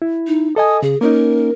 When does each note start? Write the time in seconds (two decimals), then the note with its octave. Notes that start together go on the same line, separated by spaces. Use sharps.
0.02 E4
0.27 D#4
0.56 A4 D#5 G#5 D#6
0.83 C#3 G#4
1.01 A#3 C#4 D#4 A#4